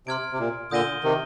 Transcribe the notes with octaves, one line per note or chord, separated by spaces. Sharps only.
C3 C6 F6 G#6 D7
C3
A#2
A#2 D3 D#6 G6 A#6 D#7 G7
C3 D#3